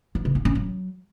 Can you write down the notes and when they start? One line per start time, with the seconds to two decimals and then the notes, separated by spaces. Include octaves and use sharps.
0.15 F#3
0.25 C#3
0.35 C#4
0.45 C#4
0.55 F#3